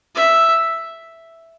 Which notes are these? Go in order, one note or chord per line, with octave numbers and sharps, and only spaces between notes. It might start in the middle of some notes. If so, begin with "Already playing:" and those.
E5